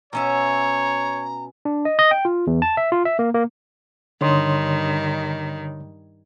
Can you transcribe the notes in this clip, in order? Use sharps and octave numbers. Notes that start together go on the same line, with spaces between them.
B2 C#4 C#5 E5 A#5
D4
D#5
D#5
G5
F4
E2
A5
E5
F4
E5
A#3
A#3
G2 D3 D#3 C#5 C6